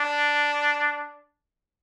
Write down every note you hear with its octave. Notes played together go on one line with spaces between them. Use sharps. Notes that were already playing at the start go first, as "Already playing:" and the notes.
Already playing: D4